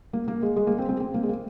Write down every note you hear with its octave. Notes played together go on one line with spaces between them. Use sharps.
A#3
A#3
G#3
G#3
A#3
C4
C4
C4
A#3
G#3
A#3